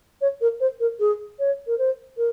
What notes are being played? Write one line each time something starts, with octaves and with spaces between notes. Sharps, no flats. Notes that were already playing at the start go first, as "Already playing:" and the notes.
C#5
A#4
C5
A#4
G#4
C#5
A#4
C5
A#4